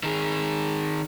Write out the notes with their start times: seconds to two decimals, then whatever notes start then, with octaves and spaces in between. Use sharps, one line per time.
0.03 D#3 G#4